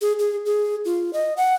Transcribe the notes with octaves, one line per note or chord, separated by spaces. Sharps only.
G#4
G#4
G#4
F4
D#5
F#5